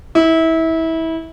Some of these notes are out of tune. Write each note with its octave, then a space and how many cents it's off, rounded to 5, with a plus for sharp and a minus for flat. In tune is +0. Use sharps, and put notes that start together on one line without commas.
E4 -25